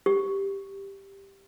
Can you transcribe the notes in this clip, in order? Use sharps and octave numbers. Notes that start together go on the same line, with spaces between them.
G4